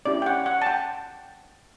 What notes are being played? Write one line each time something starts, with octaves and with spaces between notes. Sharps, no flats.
C#4 E4 G4 D5
G5
F#5
F#5
A5
G5